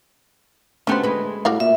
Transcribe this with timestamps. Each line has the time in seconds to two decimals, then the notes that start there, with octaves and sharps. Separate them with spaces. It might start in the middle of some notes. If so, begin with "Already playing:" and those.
0.87 D2 A3 B3 C#4 G4 C5
1.03 G#3 B4
1.45 A2 G3 F#4 F5
1.60 A#2 E5